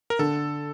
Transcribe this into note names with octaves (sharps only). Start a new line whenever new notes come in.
A#4
D3 A4